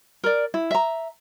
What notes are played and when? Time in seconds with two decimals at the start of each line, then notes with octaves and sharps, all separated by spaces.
0.24 A#4 D5
0.54 E4
0.71 E5 A#5